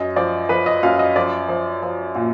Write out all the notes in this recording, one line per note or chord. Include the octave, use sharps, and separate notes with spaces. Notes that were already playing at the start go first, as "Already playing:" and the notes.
Already playing: F#2 D#5
F3 D5
F3 B4
D#5
F#2 F5
D#5
F3 D5
F3
F3
A#2